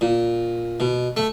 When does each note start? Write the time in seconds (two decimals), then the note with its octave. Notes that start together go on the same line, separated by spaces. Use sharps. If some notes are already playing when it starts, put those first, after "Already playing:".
0.01 A#2
0.80 B2
1.17 A3